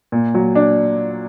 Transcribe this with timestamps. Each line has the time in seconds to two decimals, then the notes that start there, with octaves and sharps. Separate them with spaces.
0.12 A#2
0.35 F#3
0.55 D4